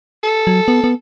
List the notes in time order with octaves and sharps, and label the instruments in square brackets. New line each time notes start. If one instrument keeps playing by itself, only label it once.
[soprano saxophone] A4
[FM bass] F#3
B3
B3